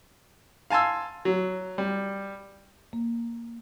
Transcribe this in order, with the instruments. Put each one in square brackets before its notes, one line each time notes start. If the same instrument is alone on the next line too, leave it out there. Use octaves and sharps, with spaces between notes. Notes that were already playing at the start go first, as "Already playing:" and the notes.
[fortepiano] F5 G#5 A5 C6 E6
F#3
G3
[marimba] A#3